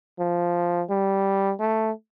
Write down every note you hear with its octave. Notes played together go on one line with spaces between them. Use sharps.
F3
G3
A3